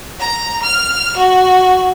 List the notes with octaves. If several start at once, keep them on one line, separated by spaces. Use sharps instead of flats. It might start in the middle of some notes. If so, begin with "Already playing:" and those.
A#5
F6
F#4